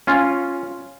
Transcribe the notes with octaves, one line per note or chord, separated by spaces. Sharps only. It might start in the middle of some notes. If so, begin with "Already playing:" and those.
C#4 F4